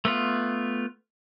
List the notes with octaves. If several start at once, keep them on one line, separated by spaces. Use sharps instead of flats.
A3 B3 F4